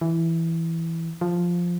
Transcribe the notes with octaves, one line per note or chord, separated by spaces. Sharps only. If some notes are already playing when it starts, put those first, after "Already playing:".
E3
F3